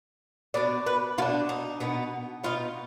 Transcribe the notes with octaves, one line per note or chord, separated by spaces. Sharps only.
B2 B3 D4 D5
B4
B2 B3 D4 F4
D#4
B2 B3 D#4
B2 B3 D#4 F4